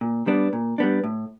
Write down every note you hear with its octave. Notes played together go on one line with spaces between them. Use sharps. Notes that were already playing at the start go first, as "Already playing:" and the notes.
A#2
G3 B3 D4
A#2
G3 B3 D4
A2